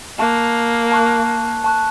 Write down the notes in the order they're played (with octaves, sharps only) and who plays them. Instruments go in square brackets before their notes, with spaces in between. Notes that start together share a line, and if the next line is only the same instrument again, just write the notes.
[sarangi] A#3 [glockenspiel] A5 C#6 F#6
[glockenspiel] A5 C#6 F#6
A5 C#6 F#6